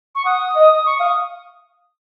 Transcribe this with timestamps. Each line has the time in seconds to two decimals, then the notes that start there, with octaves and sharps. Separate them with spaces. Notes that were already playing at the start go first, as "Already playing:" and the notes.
0.15 C#6
0.25 F#5 D#6
0.56 D#5
0.86 C#6
0.97 F5 D#6